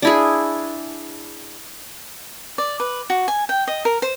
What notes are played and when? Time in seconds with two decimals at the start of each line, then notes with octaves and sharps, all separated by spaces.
0.02 D4 E4 G#4
2.58 D5
2.80 B4
3.10 F#4
3.28 G#5
3.49 G5
3.67 D#5
3.85 A#4
4.02 C5